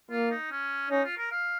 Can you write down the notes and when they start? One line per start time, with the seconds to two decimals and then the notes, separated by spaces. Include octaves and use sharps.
0.11 A#3 F4
0.31 D#4
0.51 C#4
0.91 C#4 D#4
1.04 F4
1.18 A#4
1.32 F5